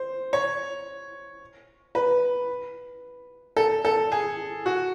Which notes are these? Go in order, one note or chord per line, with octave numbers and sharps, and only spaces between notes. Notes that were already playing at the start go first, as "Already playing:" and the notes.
Already playing: C5
C#5
B4
A4
A4
G#4
F#4